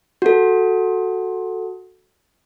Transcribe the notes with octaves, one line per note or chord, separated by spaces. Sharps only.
F#4 A4